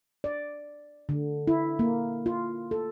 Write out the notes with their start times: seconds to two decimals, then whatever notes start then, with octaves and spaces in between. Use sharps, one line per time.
0.24 D5
1.09 D3
1.48 E4
1.79 A#3
2.26 F4
2.71 A4